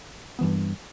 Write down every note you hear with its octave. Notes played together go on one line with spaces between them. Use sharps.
G2 E3 B3